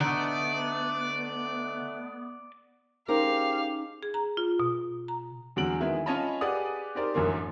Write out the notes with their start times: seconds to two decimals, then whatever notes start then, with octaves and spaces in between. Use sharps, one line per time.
0.01 D3 A3 B3 D#4 D5
3.08 C#4 D#4 G4 G#4 A#4 C5 F5
4.03 G#4
4.14 A#5
4.37 F4
4.60 B2
5.08 A#5
5.56 E2 D3 F#3 G#3 D7 F#7
5.81 D#3 G#3 B3 E4
6.06 C#4 F4 C#5 D#5 A5 B5
6.41 G4 G#4 B4 D5 F#5 D#6
6.95 D#4 G4 A#4 C5 D5
7.14 A1 F#2 D3 A#3 C6